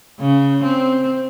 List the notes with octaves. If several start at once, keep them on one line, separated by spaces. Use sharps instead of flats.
C#3
C4